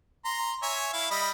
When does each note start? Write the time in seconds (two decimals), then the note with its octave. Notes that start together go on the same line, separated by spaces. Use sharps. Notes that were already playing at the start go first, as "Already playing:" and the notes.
0.25 A#5 C6
0.63 C#5 E5 G#5
0.93 E4 F5
1.11 G3 D#5 B5